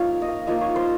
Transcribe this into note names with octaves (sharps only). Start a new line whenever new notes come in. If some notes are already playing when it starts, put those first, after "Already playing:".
Already playing: F3 A#3 D#4 C#5 F5
D#5
F5
F3 A#3 D#4 D#5
C#5
C5